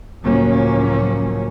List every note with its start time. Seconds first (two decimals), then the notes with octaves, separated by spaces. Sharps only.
0.24 C#2 A2 F3 F#3 A#3 C#4